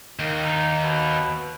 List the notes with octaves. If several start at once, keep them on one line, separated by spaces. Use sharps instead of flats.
D#2 D#3
D#4
B2